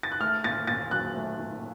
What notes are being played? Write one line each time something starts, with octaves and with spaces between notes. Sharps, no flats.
A6
F#6
A3 F6
A#2 A6
A#2 A6
F#3 F#6
A3
A#2